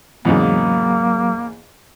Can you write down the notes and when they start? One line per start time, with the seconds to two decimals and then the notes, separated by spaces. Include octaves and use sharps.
0.25 E2 G#2 C#3 F#3 A#3